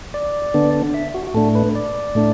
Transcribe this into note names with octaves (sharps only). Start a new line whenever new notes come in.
D5
D3 B3 D4
E5
F#4
F#4
A2 A3 D4 A4
B4
D5
A2 A3 D4